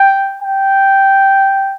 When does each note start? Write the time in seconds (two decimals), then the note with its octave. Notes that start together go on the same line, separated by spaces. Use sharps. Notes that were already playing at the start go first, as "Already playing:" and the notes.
Already playing: G5
0.42 G5